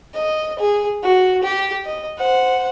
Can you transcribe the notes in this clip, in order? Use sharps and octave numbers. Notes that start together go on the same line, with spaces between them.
D#5
G#4
F#4
G4
D#5
C5 F#5